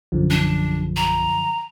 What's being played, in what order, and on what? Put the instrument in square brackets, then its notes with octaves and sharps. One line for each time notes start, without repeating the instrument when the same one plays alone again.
[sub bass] A#1 [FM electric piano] F#2 D3 F3
[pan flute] D4
A#5